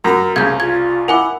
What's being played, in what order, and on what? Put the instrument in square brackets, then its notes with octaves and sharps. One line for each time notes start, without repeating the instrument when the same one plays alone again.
[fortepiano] F#2 A#5 [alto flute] A#4
[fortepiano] C2 C#3 [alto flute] G#4 [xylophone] G6 G#6
[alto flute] F4 [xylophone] G#6
[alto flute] E4 [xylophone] A#4 G#5 D6 [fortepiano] F#5